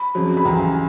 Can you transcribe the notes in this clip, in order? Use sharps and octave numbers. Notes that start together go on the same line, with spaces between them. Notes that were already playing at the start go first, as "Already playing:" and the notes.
Already playing: B5
F2 C#3 F#3
B5
C#2 C#3 E3 G3 A#5